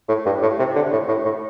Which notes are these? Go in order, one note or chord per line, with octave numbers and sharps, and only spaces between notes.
A2
G2
A2
C3
D3
A2
A2
A2